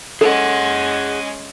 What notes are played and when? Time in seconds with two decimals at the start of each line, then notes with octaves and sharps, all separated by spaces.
0.21 G#3 C#4 G#4 A4 F#5